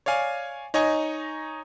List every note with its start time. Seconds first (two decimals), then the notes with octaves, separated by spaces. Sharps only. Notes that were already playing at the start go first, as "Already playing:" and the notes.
0.06 C#5 D5 F5 G#5
0.74 D#4 C#5 D#5 G#5 C#6